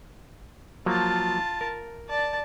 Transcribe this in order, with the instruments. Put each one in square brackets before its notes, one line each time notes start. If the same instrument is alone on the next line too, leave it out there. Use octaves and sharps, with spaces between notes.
[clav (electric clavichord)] F3 F#3 A#3 [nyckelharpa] F4 A5
[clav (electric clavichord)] A#4
[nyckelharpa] D5 A5